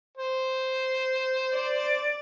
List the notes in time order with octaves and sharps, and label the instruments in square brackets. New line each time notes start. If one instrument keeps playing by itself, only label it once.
[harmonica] C5
[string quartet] D5